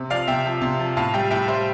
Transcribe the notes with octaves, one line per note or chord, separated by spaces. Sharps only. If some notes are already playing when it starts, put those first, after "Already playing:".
Already playing: C3
F3 D5 F5
C3 E5 G5
F3
C3
F3
A2 F5 A5
G3 E5 G5
A2 E5 G5
G3 C5 E5